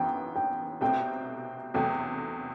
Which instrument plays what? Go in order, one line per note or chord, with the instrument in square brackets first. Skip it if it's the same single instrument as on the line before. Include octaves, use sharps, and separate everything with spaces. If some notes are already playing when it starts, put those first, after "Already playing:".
Already playing: [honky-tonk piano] F#1 F#2 E3 B3 [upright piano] G5
[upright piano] G5
[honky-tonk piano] C2 B2 A3 C4 [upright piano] G5
[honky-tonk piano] E2 C3 F#3 A3 [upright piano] G5